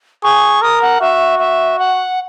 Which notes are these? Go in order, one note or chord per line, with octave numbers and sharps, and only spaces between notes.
G#4 C#6
A#4 D#6
F#5
F#4 E5
E5
F#5